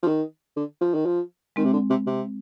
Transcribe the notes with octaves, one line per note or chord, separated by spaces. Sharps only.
F3
D#3
D3
F3
D#3
F3
D#3 G#3 C4
C3
D3
C3
C3